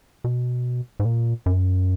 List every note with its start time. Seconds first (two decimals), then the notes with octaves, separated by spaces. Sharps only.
0.24 B2
1.00 G#2
1.05 A#2
1.46 F#2